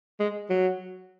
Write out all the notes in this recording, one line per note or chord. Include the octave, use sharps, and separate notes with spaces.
G#3
F#3